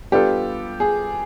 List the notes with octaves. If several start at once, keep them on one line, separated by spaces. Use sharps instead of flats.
G3 B3 D4 F4 G4 A4
G#4